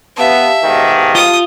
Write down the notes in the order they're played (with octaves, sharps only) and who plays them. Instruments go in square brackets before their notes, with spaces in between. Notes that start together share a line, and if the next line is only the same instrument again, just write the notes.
[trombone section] B3 [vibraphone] G4 F5 A5 [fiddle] E5
[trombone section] G#2 B2 D#3
[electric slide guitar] F4 [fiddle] D#6